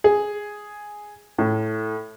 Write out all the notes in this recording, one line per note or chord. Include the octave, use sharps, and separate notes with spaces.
G#4
A2